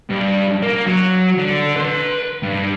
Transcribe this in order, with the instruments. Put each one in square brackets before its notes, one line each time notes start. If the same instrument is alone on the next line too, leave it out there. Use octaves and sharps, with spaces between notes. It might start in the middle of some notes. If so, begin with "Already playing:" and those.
[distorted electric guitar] G2
A#3
F#3
D3
B4 C6
G2